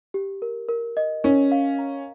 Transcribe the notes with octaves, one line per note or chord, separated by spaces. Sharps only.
G4
A#4
A#4
D#5
C#4 A#4
F5
A#5